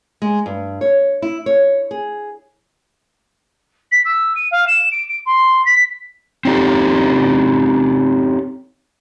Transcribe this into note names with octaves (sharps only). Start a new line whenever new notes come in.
G#3
G2
C#5
E4
C#5
G#4
B6
E6
D#7
F5
E7
D7
D7
C6
B6
C4 C#4 D#4 G4 A4